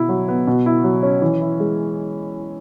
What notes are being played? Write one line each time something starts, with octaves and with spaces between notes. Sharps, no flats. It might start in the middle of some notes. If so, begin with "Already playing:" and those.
Already playing: B2 E4
F#3
B3
B2
E4
F#3
C#4
E3
E4
G#3